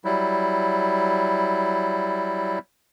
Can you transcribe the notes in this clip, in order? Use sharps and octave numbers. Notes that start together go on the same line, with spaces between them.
F#3 G3 E4